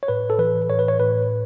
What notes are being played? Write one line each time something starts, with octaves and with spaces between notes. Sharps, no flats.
C#5
A2 B4
A4
E3 B4
A2 C#5
B4
C#5
A2 B4